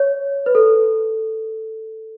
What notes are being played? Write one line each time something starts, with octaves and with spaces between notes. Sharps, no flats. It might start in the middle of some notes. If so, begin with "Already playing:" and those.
Already playing: C#5
B4
A4